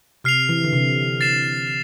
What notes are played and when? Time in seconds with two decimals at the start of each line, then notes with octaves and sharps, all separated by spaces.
0.24 C3 F6 C7 F7
0.49 E3
0.64 D3
0.73 C3
1.21 A6 C7 E7